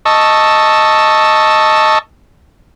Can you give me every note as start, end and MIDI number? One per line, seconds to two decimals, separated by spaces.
0.05 1.99 75
0.05 1.99 81
0.05 1.99 85
0.05 1.99 88